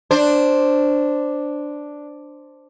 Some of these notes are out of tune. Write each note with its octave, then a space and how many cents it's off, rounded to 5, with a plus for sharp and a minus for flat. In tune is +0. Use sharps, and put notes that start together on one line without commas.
D4 +0 C5 +0